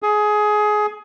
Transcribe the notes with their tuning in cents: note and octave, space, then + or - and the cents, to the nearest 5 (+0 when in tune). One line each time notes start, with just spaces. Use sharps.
G#4 +20